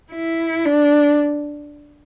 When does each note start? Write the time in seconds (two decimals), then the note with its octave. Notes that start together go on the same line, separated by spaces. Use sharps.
0.12 E4
0.65 D4